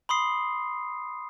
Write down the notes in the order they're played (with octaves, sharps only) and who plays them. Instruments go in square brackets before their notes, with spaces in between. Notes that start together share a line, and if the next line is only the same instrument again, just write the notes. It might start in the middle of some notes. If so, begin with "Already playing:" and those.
[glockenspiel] B5 C6 D#6 C7